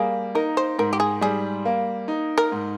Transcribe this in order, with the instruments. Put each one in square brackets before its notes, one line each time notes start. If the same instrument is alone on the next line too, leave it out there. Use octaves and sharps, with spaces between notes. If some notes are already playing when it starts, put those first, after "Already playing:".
Already playing: [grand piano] G3 A#3 [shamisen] G#4
[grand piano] D#4 [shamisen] A#4
[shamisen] C5
[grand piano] G#2 [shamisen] A#4
[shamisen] G4
G#4
[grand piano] G3 [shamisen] G#4
[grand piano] A#3
D#4
[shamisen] A#4
[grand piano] G#2